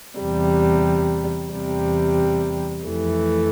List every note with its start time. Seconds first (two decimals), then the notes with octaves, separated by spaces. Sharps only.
0.20 E2 C3 G3
1.53 E2 C3 G3
2.86 F2 E3 A3